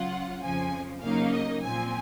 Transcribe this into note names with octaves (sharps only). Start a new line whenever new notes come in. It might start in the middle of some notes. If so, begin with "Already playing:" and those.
Already playing: C#3 F#3 C#4 F4 F#5
F2 C#3 F3 G#5
C#3 F#3 A#3 D#4 F5
D#5
A#2 F3 C4 G#5